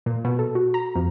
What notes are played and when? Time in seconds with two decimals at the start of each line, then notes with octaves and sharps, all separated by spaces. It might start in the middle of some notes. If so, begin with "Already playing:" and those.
0.06 A#2
0.25 B2
0.39 A4
0.55 F#4
0.74 A#5
0.95 F2